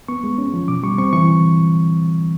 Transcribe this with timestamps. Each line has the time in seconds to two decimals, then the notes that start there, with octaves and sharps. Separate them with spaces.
0.08 B3 C#6
0.24 G#3
0.38 C#4
0.54 F3
0.68 B2 D6
0.83 G3 C#6
0.98 C4 C#6
1.13 E3 C#6